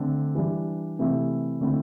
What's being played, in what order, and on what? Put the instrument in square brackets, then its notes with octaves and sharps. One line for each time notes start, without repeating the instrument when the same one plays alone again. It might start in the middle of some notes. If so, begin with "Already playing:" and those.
Already playing: [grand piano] D3 A3 C4
E3 G3 D4
C3 E3 A3 E4
D3 A3 C4 E4